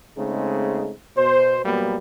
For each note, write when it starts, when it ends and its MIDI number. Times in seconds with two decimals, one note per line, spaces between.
0.17 0.93 49
0.17 0.93 56
0.17 0.93 57
0.17 0.93 60
0.17 0.93 63
1.16 1.65 47
1.16 1.65 72
1.65 1.98 46
1.65 1.98 54
1.65 1.98 55
1.65 1.98 58
1.65 1.98 59